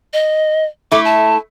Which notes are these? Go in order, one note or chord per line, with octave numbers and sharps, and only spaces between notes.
D#5
A3 E4 D6
A5